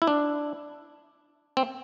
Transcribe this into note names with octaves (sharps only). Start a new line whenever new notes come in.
E4
D4
C4